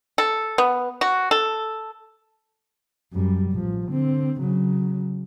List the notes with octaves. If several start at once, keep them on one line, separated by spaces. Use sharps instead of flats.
A4
B3
F#4
A4
F#2 G3
A1 F3
D3 C4
C#3 F#3